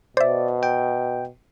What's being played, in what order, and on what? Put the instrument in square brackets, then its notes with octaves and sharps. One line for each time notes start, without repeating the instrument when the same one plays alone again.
[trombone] B2 [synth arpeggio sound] C5 E5 [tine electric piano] D5
[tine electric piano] G5